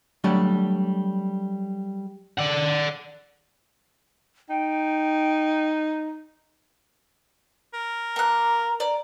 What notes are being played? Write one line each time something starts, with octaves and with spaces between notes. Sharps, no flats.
F#3 G3 A3 D4
D5 F#5
D#4 G5
A#4
A#3 A#5 F#6
D5 A#5